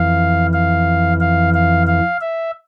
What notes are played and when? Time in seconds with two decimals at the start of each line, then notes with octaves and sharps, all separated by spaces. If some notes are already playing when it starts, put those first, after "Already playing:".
Already playing: F2 E3 F5
0.53 F5
1.20 F5
1.54 F5
1.87 F5
2.21 E5